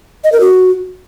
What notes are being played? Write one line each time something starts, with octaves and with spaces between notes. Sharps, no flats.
D#5
A#4
F#4